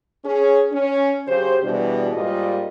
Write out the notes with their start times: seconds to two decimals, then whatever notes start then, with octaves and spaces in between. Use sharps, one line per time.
0.24 C#4 G#4
0.71 C#4
1.27 C#3 F#3 G4 C5
1.63 B2 E3 G3 D4 F#4 G#4
2.12 G#2 G3 A#3 F4 D#5